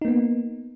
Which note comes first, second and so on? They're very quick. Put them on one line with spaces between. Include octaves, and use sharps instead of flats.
D#4 A#3 B3